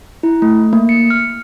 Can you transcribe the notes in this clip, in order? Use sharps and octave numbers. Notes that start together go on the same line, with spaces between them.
E4
A3
A#3
C#7
F6